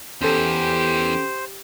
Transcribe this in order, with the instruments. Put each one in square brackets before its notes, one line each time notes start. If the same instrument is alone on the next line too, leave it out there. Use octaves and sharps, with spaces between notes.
[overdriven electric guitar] E2 E3 [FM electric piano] C#4 A4 [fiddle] G4 [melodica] C5